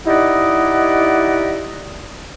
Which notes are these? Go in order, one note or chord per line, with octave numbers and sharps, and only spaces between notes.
D#4 E4 G4 D5 D#5 F#5